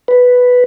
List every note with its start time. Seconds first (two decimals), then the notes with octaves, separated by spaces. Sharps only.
0.08 B4